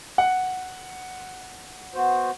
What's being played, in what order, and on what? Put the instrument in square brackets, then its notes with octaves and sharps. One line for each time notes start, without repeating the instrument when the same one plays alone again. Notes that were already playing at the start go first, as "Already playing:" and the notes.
[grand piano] F#5
[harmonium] B3 F#4 C5